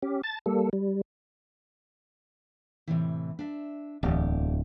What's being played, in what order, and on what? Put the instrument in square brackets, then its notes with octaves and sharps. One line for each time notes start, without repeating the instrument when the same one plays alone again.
[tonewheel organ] C#4 G4
A5 A6
G3 A#3 A4
G3
[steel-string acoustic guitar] A2 C3 E3
D4 E5
[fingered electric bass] D1 [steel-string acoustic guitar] E2 G4